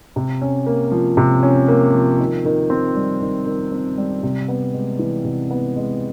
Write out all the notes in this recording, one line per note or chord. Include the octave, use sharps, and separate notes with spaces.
C3
C#4
A#3
F3
C3
C#4
A#3
F3
D#3
D#3
C4
G3
D#3
D#3
C4
G3
C3
B3
G#3
E3
C3
B3
G#3